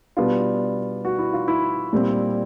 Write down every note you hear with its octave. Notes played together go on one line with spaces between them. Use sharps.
B2 G3 B3 D4 F4
F#4
E4
F4
E4
A#2 G3 C4